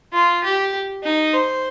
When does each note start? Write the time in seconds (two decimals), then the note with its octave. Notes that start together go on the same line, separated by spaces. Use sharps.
0.13 F4
0.44 G4
1.04 D#4
1.33 C5